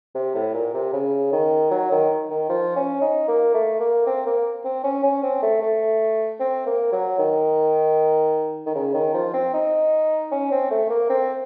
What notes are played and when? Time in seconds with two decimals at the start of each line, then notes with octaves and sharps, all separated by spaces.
0.15 C3
0.35 A2
0.54 A#2
0.74 C3
0.93 C#3
1.33 D#3
1.71 F#3
1.91 D#3
2.30 D#3
2.49 F3
2.76 C#4
3.01 D#4
3.28 A#3
3.54 A3
3.80 A#3
4.06 C4
4.26 A#3
4.65 C4
4.84 C#4
5.04 C#4
5.23 C4
5.42 A3
5.62 A3
6.40 C4
6.67 A#3
6.92 F#3
7.18 D#3
8.66 D#3
8.75 C#3
8.94 D#3
9.14 F3
9.34 C4
9.54 D#4
10.32 C#4
10.51 C4
10.71 A3
10.90 A#3
11.10 C4